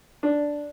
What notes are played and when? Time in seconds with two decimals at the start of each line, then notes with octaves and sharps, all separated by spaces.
0.23 D4